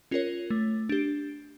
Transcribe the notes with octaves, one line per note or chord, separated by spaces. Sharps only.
C#4 F4 A#4 C#5
A3
D4 G4